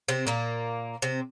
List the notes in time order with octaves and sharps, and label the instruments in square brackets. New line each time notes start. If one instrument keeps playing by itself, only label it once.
[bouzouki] C3 C4
A#2 A#3
C3 C4